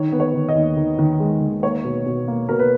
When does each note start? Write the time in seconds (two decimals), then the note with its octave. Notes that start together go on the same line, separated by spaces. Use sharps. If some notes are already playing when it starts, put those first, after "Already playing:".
Already playing: D#3 C#5
0.12 B3
0.20 C#5
0.34 D#3
0.49 D#5
0.55 D#2
0.77 D#3
0.99 D#3
1.20 G#3
1.41 D#3
1.63 A#3 C#5
1.84 B2
2.06 B2
2.28 A#3
2.49 B2 A#4
2.59 B4